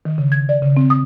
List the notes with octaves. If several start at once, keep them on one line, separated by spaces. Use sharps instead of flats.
D#3
C#3
G#6
D5
C#3
C4
D#6